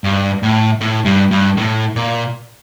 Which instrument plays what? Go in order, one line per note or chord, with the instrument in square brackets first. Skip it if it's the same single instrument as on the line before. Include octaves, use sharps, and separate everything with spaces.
[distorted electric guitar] G2
A2
A2
G2
G2
A2
A#2